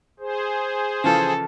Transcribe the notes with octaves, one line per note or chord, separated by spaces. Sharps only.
G#4 C5
C#3 E3 F3 A4